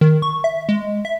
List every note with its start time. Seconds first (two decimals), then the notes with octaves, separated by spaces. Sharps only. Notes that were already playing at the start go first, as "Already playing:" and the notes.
0.01 D#3
0.22 C#6
0.44 E5
0.69 G#3
1.05 E5